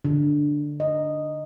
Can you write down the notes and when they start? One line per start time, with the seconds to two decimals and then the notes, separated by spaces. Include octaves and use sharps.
0.05 D3
0.80 D#5